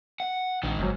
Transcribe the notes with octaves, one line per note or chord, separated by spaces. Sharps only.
F#5
A#1 D#3 G#3
G1 G#2 F#3